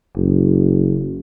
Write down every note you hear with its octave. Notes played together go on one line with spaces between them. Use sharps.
F#1